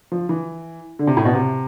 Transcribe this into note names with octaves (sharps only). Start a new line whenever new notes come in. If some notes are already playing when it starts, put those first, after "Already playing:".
F3
E3
D3
C3
A2
B2
C3